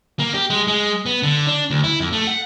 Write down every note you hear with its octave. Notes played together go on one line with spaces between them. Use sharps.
A#3
G4
G#3
G#3
B3
D3
D4
D2
E4
F2
A3
F#5